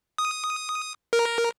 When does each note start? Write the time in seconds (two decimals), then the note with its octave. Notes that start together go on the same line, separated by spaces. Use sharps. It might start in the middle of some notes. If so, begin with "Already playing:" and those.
0.18 D#6
1.13 A#4